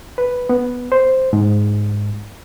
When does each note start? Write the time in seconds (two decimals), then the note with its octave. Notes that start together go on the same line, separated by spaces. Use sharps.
0.18 B4
0.49 B3
0.92 C5
1.33 G#2